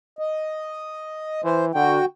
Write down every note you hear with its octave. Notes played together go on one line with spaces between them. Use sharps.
D#5
E3 C5
D3 F#4 G5